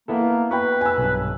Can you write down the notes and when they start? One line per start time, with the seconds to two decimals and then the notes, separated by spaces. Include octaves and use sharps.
0.08 A#3 B3 E4 A4
0.51 B4 G5 B5 C#6
0.81 G#5 E6
0.98 B1 G2